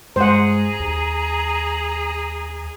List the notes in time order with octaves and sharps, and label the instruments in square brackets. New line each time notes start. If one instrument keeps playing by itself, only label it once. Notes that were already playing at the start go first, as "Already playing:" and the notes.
[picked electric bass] G2 G#3 [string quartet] G#4 A#5 [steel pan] C5 F#5
[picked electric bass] D#2